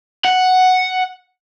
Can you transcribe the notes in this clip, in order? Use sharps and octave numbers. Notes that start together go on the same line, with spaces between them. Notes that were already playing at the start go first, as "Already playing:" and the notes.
F#5